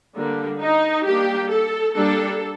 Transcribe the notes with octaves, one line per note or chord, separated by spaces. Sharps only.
D3 G3 A#3 D4
D#4
G3 A#3 D4 G4
A4
G3 A#3 D4 A4